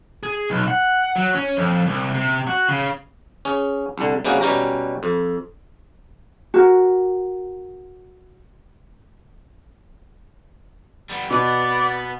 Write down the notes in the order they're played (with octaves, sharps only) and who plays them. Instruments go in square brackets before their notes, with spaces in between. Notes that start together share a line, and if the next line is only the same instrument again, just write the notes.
[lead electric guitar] G#4
B1
F#5
F#3
C#4
F2
C2
C3
F#4
C#3
[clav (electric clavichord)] C#4 G#4
C2 D3
C3 G3 A#3 C#4 F#4 G#4
B2 G3 C#4 G4 A#5
F2
[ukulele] F#4 A#4
[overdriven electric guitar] G3 B3
[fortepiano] B2 [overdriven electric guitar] B3 B4 [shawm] D5